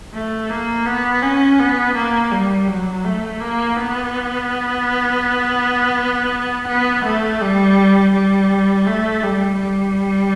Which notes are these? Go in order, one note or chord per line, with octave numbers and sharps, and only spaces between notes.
A3
A#3
B3
C#4
B3
A#3
G3
F#3
A3
A#3
B3
B3
A3
G3
G3
A3
G3
G3